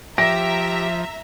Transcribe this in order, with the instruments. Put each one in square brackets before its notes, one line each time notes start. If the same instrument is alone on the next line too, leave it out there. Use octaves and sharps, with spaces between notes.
[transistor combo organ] F3 [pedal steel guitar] G4 [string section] E5 A#5 [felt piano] A#6